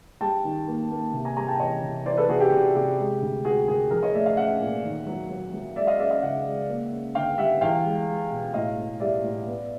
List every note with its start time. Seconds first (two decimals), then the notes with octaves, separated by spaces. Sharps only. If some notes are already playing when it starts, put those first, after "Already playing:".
0.21 G3 G5 A5
0.44 D#3
0.67 A#3
0.90 A#3
1.13 C3
1.25 G#5 A#5
1.36 G3 G#5 A#5
1.48 G5 A5
1.60 E2 C#5 D#5
1.83 C3
2.06 E3 C5 D5
2.17 A4 B4
2.29 C3 F#4 G#4
2.40 G4
2.52 C3 F#4
2.75 C3 G4
2.98 G#3
3.22 D2
3.45 G#3 F#4 G#4
3.68 D2 G#4 A#4
3.91 F3 G#4 A#4
4.03 C#5 D#5
4.14 A3 D5 E5
4.26 D#5 F5
4.37 C#4 E5 F#5
4.60 A#2
4.84 D#2
5.07 F#3
5.30 F#3
5.53 F#3
5.76 G#3 D5 E5
5.87 D#5 F5
5.99 C#4 D5 E5
6.10 D#5 F5
6.22 C#3 E5 F#5
6.45 G#3
6.68 A#3
6.92 C#4
7.15 D3 F5 G5
7.38 G3 E5 F#5
7.61 E2 F5 G5
7.84 G#3
8.08 G#3
8.31 B2
8.54 A2 D#5 F5
8.77 A2
9.00 G3 D5 E5
9.23 A2
9.46 B3